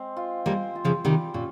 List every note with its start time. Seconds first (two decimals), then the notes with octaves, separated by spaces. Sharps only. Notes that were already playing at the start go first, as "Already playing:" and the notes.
Already playing: G#3 C4
0.17 F4
0.46 G3 A#3 C5
0.76 F4
0.85 C#3 F3
1.04 C3 D#3 G3
1.34 A#2 C#4